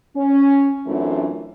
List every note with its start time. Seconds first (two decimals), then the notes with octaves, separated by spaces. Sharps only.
0.16 C#4
0.86 F#2 E3 A3 C4 D4 F4